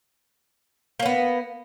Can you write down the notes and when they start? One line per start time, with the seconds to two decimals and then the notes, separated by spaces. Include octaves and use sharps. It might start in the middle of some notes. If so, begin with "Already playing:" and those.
1.00 A#3
1.03 C#4
1.06 B3